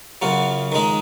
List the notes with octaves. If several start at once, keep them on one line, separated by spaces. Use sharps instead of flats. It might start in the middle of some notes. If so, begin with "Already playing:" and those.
F#2 C#3 F#3 F4
D#3 G#3 D#4